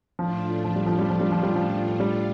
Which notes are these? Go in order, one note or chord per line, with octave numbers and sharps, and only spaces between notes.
A2 F3 A3 D4 F4
F3
G3
F3
G3
F3
G3
F3
G3
F3
G3